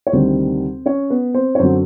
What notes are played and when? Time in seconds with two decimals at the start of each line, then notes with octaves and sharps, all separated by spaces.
0.07 C#5
0.12 D2 C3 D#3 G3 C4 C5
0.86 C#4 C#5
1.10 B3 B4
1.34 C4 C5
1.55 C#5
1.59 F#2 D3 F#3 C4 C5